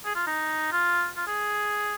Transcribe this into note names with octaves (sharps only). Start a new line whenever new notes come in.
G#4
F4
D#4
F4
F4
G#4